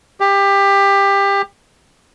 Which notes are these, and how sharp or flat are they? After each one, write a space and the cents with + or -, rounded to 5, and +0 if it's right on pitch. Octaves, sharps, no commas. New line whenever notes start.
G4 +20